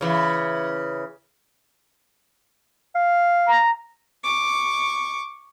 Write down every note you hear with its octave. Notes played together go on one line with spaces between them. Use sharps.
C#3 E3
F5
A#5
C#6 D6